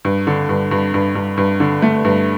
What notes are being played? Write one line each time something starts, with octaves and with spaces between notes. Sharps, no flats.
G2
D3
G2
G2
G2
G2
G2
D3
A3
G2